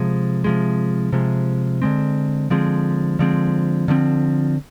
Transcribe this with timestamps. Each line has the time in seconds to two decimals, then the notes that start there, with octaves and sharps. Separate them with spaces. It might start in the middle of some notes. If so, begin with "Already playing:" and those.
Already playing: C3 F3 G#3
0.44 C3 F3 G#3
1.13 C3 F3 G#3
1.82 D3 F3 G#3 C4
2.50 D3 F3 G#3 C4
3.19 D3 F3 G#3 C4
3.88 D3 F3 G#3 C4